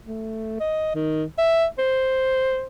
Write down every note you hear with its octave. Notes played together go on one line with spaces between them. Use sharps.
A3
D#5
D#3
E5
C5